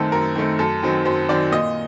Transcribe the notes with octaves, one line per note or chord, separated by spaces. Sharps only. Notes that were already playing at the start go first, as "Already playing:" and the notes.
Already playing: F#2 D#3 A3 C4 A4
F#2 A#4
D#3 A3 C4
F#2 A4
D#3 F#3 C4
F#2 C5
D#3 F#3 C4 D5
A#2 D#5